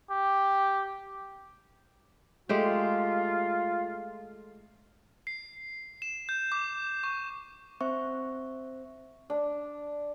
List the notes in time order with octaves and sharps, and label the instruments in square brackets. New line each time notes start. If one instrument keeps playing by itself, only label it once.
[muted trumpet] G4
[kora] G#3 A3 G4 [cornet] F4
[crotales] C7
E7
G6
D6
C#6
[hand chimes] C4 C5 E5 C#6
[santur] D4